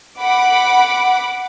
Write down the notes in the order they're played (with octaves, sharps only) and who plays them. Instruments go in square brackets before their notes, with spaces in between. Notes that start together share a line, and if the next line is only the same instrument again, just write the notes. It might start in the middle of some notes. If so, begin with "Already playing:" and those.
[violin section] F#5 B5 D6